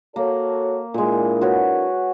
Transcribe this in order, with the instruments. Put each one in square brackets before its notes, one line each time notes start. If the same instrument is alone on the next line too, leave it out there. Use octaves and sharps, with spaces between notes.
[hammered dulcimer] A#3 [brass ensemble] F#4 A4 C#5
[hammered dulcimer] A#2 G#3 [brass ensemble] D4 E4 A#4
[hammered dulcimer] F#4 B4 C#5